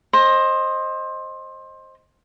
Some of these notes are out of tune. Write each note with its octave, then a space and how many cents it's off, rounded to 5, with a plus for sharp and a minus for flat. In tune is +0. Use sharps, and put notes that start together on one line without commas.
C5 +20 D#5 +0